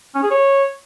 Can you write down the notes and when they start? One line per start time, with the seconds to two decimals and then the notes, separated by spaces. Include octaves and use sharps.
0.15 C#4
0.23 G#4
0.31 C#5